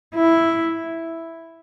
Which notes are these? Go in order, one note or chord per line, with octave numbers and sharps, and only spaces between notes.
E4